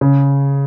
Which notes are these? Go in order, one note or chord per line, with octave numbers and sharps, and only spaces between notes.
C#3